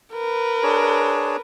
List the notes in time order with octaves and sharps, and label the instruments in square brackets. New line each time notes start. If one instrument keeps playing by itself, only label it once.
[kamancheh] A#4 B4
[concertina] D4 G#4 C#5